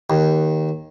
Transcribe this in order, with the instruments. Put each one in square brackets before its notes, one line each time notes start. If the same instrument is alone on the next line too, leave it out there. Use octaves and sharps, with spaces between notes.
[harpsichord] D#2